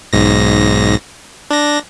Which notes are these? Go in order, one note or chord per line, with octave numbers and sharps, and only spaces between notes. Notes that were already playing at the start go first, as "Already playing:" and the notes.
B1 G#2 A#6
D4 A#6